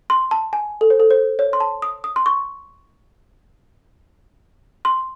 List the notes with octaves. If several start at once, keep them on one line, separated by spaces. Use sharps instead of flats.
C6
A5
G#5
A4
C5
A4
C5
C#5
C6
A5
D#6
D#6
C6
C#6
C6